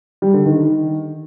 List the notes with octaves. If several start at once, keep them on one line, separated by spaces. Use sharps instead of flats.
G3
D3
D#3